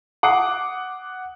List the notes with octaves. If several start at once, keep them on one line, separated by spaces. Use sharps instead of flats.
F#5 D6 D#6 C7